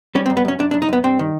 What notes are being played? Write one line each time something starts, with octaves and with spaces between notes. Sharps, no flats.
G3 C#4
C4
F#2
B3
F#2 C#4
F#2 D4
F#2 D4
D#4
F#2 B3
G2 C4
D#3